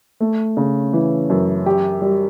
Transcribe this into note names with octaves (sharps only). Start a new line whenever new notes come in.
A3
C#3
E3
F#2
G4
G3